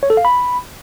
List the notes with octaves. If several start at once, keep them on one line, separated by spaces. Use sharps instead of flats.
C#5
A4
F5
B5